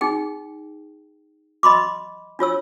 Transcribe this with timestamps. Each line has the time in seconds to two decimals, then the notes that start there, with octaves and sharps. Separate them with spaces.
0.01 D#4 G#4 G5
1.63 D#5 B5 C6 D6
2.39 D4 F4 C#5 E6